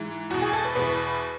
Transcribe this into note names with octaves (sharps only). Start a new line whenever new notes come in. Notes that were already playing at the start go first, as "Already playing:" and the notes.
Already playing: G#2 E3
E2 B2 F#4
G#4
A4
B4
E2 B2 B4